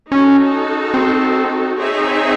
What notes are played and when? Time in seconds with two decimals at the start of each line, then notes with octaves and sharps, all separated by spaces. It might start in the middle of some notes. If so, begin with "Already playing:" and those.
0.11 C#4 D#4 F#4 A4
0.94 C4
1.77 C4 D#4 G#4 C#5 E5